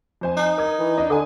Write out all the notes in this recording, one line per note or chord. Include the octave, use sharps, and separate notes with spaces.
F2 C5 G#5
D#4
A#4 D#6 G#6
E3
D4 D#5
D3 G#5 D#6